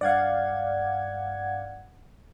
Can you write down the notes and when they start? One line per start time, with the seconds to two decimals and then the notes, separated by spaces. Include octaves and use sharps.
0.01 G2 D5 F5 F#5 G#6